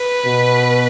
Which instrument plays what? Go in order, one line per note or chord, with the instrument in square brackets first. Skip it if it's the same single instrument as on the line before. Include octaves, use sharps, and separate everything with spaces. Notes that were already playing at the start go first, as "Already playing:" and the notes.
Already playing: [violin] B4
[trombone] B2